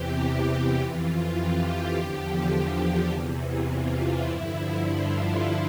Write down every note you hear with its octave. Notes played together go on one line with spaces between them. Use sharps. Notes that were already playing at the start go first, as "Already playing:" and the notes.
Already playing: E2 C3 E3 G4
F2 E3 F4
G4
E2 D3 F3
E2 C3 E3
F4
E4
G2 D3 F3
F4